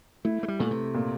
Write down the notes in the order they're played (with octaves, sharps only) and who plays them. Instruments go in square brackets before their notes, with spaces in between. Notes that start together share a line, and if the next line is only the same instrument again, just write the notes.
[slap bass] A3 [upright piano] E4
[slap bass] A3
G3
[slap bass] A#2 [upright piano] A3
[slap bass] C3
[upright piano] A#2